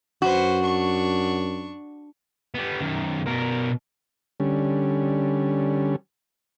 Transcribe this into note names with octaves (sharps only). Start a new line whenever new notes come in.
F#2 F#4 B4 C5
D4 C#6
G3 B3
F#2 D#3
B2 A#4
D3 G3 C#4